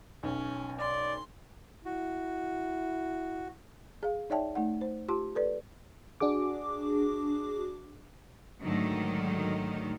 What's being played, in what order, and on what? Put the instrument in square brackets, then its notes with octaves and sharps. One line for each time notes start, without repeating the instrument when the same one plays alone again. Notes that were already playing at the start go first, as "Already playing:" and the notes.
[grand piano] B1 [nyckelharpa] C#4
[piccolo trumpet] D5 [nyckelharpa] C6
[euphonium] E4 [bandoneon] F#4
[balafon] G#4 F5
D#4 C#5 D5 E5 G5 A5
A3 D#4 F#5
C5
F4 G4 A5 C6
A4 B4 D5
[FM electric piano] D4 F#4 G#4 D6
[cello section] G#2 D3 D#3 F#3 A3 D#4